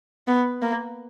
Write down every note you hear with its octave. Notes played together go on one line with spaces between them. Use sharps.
B3
A#3